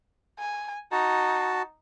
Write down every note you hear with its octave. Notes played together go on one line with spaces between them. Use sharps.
G#5
D#4 F#4 A5